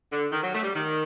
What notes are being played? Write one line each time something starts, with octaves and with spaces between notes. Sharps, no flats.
D3
D#3
F#3
A3
G3
D#3